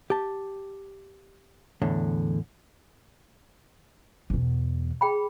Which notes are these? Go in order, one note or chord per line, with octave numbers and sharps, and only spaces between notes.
G4 A5
E2 A2 D3
E2 B2
G#4 G5 B5